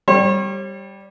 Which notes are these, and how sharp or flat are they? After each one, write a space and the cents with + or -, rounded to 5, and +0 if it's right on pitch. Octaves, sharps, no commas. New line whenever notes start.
G3 +0 C#5 -40